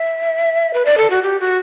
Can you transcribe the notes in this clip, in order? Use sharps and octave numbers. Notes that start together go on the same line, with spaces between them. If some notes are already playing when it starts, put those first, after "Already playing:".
Already playing: E5
B4
D5
A4
F#4
G4
F#4